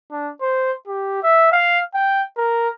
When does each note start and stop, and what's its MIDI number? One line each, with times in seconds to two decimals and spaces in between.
0.12 0.31 62
0.41 0.72 72
0.87 1.18 67
1.23 1.51 76
1.52 1.79 77
1.94 2.23 79
2.38 2.69 70